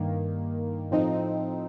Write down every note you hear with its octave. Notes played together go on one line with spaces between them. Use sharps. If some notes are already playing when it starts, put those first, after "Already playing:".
Already playing: G2 D#3 A#3
A2 F3 C4 D#4